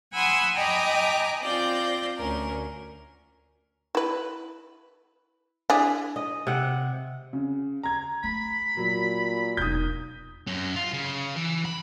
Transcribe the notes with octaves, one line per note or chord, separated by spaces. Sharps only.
F#5 G#5 B5 C6 D#6 E6
D#5 G5 G#5 A#5 B5 D6
C4 F4 D5 G6 A#6
D2 C#4 A#4
E4 B4
D4 E4 G#4
D#5
C3 F#5
C#3
A#5 G#6
A3 B5
A#2 F#3
E1 D#4 D#6 G6
F#2 C#4
F4
C#3
E3
B5